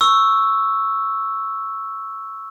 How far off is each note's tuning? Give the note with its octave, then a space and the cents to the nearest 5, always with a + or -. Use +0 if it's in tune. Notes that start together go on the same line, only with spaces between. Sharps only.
C#6 +0 E6 +0